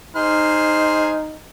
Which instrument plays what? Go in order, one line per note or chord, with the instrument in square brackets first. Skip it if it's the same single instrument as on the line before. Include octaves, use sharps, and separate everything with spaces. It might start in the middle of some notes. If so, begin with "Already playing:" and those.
[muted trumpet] D#4 [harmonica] G#4 C5 F6